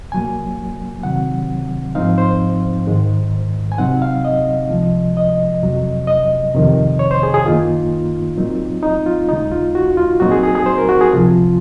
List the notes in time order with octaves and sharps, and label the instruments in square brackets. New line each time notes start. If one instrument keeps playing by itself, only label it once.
[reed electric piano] C2 A#2 F#3 A#3 G#5
C3 D#3 F#3 C4 F#5
G#2 F3 C4 D#4 F5
C5
G#2 D#3 G#3
G#5
C3 F#3 C4 D#4 F#5
F5
D#5
C#2 C3 F3 G#3
D#5
F2 C3 F#3
D#5
F2 C3 D#3
C#5
C5
G#4
G#4
F#2 D#3 A#3 D#4 F4
A#2 F#3 C4 D#4
D#4
F4
D#2 C#3 G#3 D#4
F4
F#4
F4
A#2 F#3 C4 D#4 F#4
G#4
G#4
G#4
C5
A#4
F#4
G#4
C#2 C3 F3 F4